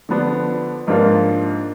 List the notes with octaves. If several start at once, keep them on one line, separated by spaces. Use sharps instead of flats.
D3 F3 B3 D4
G#2 F3 A#3 D4 F4